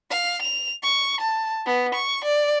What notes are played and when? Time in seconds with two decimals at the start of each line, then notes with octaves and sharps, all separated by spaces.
0.11 F5
0.42 F7
0.83 C#6
1.21 A5
1.66 B3
1.95 C#6
2.24 D5